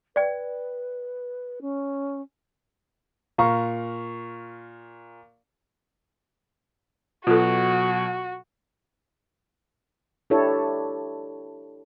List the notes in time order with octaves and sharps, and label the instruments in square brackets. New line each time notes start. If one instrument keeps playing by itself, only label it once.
[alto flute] B4 [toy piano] D5 G5
[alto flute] C#4
[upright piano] A#2 F5 A#5 C#6
[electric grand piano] B2 F#3 [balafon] F4 A4 [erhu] F#4
[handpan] D4 E4 G4 A4 C#5